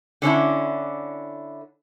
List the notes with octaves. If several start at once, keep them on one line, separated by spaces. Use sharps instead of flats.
D3 C#4 D4 E4